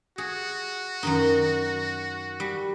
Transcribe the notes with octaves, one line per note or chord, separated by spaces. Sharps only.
F#4 G#4
F#2 D#3 D#4
G3